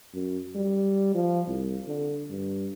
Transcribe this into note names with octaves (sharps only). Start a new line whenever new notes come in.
F#2
G3
F3
C2
D3
G2